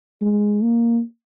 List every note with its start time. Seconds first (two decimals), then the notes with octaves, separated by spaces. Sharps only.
0.21 G#3
0.63 A#3